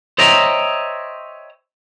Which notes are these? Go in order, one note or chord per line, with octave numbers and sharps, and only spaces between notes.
C5 C#5 D#5 E5 G5 A#5